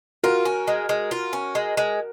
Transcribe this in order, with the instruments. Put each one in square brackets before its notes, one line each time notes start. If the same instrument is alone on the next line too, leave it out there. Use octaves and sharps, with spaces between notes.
[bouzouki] F4 [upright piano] F#4 A#4
[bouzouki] C#4
G#3
G#3
F4
C#4
G#3
G#3